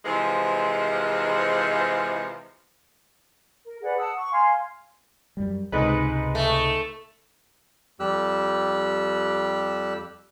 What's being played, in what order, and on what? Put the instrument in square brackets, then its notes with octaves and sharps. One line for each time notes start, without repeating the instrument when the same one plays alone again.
[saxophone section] C3 E3 F3 G#3
[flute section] A#4
G#4 B4 D5 F#5
F#5 A5 D#6 E6
C#6
F5 G#5 C6
[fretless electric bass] F#2 G3
[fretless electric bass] C#2 C3 [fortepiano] G#2 G#3 B4
[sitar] A3
[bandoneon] F2 G3 G4 E6 F#6